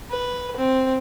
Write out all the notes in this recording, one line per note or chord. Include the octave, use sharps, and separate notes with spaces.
B4
C4